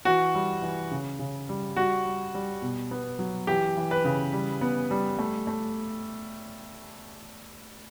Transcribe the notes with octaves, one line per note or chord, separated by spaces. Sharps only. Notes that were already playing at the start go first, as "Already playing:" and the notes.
E3 F#4
G3
E3
C#3
C#3
G3
G3 F#4
G3
G3
B2
B3
F#3
E3 G4
E3
B4
C#3
G3
B3
G3
A3
A3